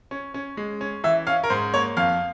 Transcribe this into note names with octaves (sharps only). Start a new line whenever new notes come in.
C#4
C#4
G#3
C#4
E3 E5
C#4 F5
A#4
G#2 C5
A#3 C#5
F2 F5